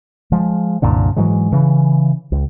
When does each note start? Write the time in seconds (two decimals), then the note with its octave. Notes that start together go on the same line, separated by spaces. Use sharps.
0.32 F3 G#3
0.82 C2 F#2 A#2 D3
1.16 G#2 E3 F#3 G#3
1.52 C#3 E3
2.32 C#2